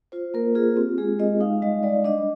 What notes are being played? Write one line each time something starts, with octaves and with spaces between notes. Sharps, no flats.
F4 C5
A#3 A#4
F4 G#4
C4 G4
G#3 G#4
G#3 D#5
D#4 F5
G3 D#5
G3 D5
D4 D#5